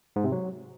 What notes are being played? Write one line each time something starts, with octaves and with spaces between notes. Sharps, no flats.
G#2
C3
F#3